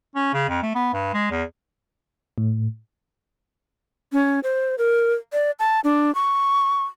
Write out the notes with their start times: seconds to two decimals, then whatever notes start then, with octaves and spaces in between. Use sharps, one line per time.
0.15 C#4
0.34 C#3
0.49 F2
0.63 A3
0.75 B3
0.93 G2
1.14 G#3
1.31 E2
2.38 A2
4.13 C#4
4.43 C5
4.78 A#4
5.33 D5
5.59 A5
5.84 D4
6.15 C#6